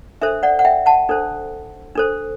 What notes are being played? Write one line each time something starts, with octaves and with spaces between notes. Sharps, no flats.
D4 A4 C5 E5
D5 F#5
F#5
E5 G5
F#5 A5
D4 A4 C5
D4 A4 C5